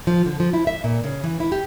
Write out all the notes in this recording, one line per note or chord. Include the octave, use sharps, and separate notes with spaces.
F3
D3
F3
E4
E5
A#2
C#3
E3
E4
G4